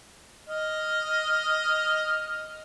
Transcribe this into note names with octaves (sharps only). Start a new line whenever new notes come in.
D#5 F6